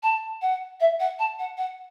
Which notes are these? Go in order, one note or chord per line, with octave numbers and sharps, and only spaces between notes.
A5
F#5
E5
F#5
A5
F#5
F#5